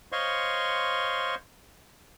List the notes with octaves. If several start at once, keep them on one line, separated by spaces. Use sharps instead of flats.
C5 C#5 D#5 F5 C6 C#6